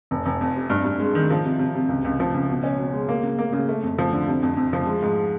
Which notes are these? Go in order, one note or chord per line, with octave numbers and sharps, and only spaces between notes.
F1
F1
F2
C3
G2
G2
G#3
D#3
F3
C3
C3
C3
C#2
C#2
F3
C#2
B2
C#4
B2
G#3
A#3
C#3
A#3
C#3
A3
F2
F3
D3
C3
F2
F2
F3
G#3
G#2